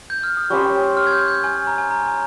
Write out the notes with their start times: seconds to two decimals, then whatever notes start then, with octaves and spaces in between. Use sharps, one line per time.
0.10 G6
0.23 F6
0.37 D#6
0.50 G3 C#4 G4 C5 C#6
0.97 F6
1.07 G#6
1.13 G6
1.28 G6
1.44 G#5
1.67 A#5
1.78 G#5
1.91 A#5
2.08 G#5